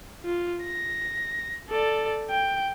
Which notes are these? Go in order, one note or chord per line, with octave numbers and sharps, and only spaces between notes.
F4
A#6
A4 D5
G5